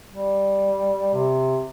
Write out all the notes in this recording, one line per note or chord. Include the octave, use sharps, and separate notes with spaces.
G3
C3